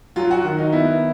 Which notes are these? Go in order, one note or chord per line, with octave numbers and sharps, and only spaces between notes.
F#3 F4
F#4
D#3
D#4
B3 E4